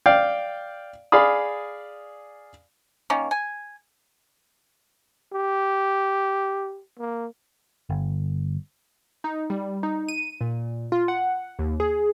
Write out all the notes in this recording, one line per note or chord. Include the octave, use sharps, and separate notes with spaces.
D5 F5 G5
G#4 D5 F5 B5 D#6
D#3 A#3 C#4
G#5
G4
A#3
G1
D#4
G3
D#4
D#7
A#2
F4
F#5
D#2
G#4